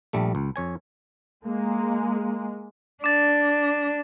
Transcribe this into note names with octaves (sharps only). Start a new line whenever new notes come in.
A#1 G3 A3
C#2
F2 C#5 G#5
G#3 A#3
D4 D6 A6